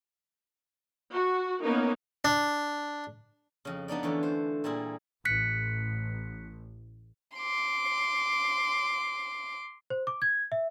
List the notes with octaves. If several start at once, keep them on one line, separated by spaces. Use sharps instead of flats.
F#4
A#3 B3 C#4 D#4 A#4
D4
F2 C#3
B3 D4 D#4 D5
D3 E3 A3 C#4
C5
A#2 G3 E4 G#4
A1 F#6 B6 C#7
C6 D6
C5
D6
G#6
E5